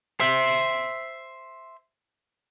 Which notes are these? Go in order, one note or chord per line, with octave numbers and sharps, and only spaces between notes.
C5 E5